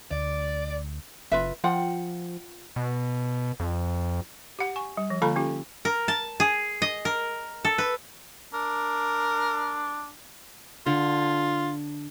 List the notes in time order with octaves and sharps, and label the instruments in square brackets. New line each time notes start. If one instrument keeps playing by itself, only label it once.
[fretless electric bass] D2 [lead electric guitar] D5
[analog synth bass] F#1 [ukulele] F4 B4 E5
[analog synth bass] F3 [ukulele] F4 F#5 G5
[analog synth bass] B2
F2
[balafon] G4 F#5
G#5 C#6
G3
F3
D3 A#3 F4 A4 A#5 B5
C#4 F4 G4
[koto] A#4
A5
G#4
D#5
A#4
A4
B4
[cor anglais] D4 [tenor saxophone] A#4
[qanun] D3 [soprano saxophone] F4